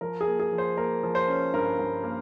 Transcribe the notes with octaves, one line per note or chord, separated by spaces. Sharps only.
F3 A#4
G#4
A#3
G#4
F3
C5
A#3 A#4
F3
C5
C#4
G2 A#4
G2
A#3